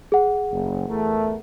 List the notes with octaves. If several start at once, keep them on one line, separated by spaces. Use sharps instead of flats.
G#4 F#5
F#1
E2 A3 A#4